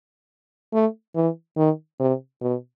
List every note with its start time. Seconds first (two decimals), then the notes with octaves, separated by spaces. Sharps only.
0.73 A3
1.15 E3
1.57 D#3
2.00 C3
2.41 B2